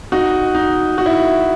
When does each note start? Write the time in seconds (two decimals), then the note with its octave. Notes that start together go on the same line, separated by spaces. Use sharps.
0.12 D#4 F#4
0.55 D#4
0.98 F#4
1.06 E4